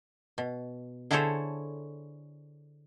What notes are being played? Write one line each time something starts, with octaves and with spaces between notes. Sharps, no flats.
B2
D3 E4 G#4 A4 C5 C#5